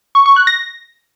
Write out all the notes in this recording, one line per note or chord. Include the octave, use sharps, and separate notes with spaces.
C#6
C#6
F#6
A#6